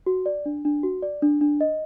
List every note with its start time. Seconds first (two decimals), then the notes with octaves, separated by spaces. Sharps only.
0.06 F#4
0.26 D5
0.46 D4
0.65 D4
0.83 F#4
1.03 D5
1.22 D4
1.41 D4
1.61 D#5